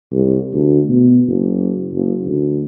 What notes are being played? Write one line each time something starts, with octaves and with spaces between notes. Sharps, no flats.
C2
D2
B2
F#1
F#1
D2